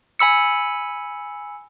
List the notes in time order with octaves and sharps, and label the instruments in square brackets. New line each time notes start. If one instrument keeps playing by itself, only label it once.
[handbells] G#5 B5 E6 C#7